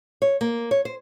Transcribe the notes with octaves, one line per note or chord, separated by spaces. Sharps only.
C#5
A#3
C#5
C5